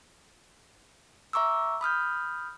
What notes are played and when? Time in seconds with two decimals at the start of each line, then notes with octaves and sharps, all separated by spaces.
1.33 E5 A#5 C#6 D6 E6
1.81 B5 D#6 F6 G6